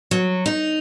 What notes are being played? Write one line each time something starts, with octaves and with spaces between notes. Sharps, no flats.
F#3
D#4